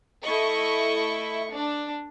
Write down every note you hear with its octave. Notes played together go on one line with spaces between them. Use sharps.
A3 E4 D#5 C#6
D4